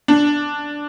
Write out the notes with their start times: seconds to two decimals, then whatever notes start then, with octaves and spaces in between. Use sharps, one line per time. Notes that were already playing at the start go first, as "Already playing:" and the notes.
0.08 D4